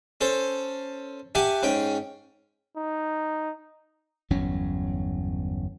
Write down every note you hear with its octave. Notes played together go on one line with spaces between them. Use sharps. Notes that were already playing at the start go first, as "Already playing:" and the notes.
C#4 A4 C5
G4 E5 F#5 G#5 A5
G#2 C#4 G5
D#4
G1 E2 F#3 C#4